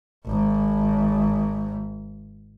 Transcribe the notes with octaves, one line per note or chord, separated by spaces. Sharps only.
G#1 G#2